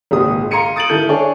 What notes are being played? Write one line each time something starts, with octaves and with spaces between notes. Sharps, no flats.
G#1 C#2 A#2 G#3 D#6
F5 A#5 C6 G#6 C#7 D#7
D#6 A6 D7 D#7 F#7
D#3 E4 A4 G6
D4 G#4 A4 C#5 D5